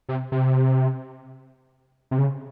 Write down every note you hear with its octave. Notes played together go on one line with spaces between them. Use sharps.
C3
C3
C3
C#3